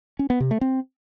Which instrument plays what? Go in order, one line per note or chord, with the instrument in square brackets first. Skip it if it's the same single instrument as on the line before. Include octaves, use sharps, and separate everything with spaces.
[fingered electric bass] C#4
B3
C3
A3
C4